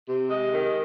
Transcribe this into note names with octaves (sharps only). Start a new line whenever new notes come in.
C3
G#3
D#3